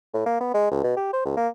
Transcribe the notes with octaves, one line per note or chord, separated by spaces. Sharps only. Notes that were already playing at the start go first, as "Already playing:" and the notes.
A2
A#3
B3
G#3
C#2
B2
G4
C5
C#2
A#3